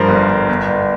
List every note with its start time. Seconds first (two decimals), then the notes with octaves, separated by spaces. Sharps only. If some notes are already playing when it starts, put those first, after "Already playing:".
Already playing: G2 F3 A#4 C5
0.08 G1
0.29 G1
0.49 G1
0.68 G1